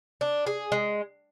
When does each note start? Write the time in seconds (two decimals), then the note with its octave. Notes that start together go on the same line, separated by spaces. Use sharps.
0.21 D4
0.47 G#4
0.72 G#3